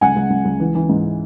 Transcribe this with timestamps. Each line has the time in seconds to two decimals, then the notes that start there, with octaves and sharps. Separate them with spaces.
0.01 C#2 F#5 G#5
0.16 C#2
0.30 C#2
0.45 C#2
0.60 E3
0.75 E3
0.89 G#2